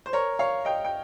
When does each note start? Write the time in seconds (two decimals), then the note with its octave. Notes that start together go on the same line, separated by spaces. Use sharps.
0.06 C5
0.13 A#4 C#5
0.39 C#5 F5
0.65 D#5 G5
0.85 G5